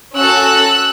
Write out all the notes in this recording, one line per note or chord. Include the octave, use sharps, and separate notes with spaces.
C#4 F#4 A4 E6 F#6